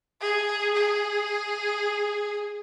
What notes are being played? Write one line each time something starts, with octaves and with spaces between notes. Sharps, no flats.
G#4
G#4